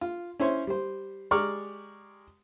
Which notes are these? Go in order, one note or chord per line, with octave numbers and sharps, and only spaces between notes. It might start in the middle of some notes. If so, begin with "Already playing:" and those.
F4
C#4 E4 C5 C#5
G3 C5
G#3 G4 D5 A#5 C#6 F6